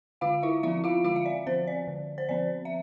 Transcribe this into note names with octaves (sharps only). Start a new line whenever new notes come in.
D3 F4 F5
E4 E5
F3 C4 E4 E5
F4 F5
D3 F4 F5
E5
D5
F3 C4 C5
D5
D3
C5
F3 C4 D5
E5